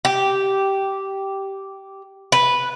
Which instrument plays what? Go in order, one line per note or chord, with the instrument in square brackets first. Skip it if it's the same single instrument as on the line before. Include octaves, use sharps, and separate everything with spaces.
[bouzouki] G4
B4